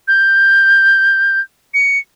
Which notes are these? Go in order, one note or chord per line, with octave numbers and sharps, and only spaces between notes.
G6
C#7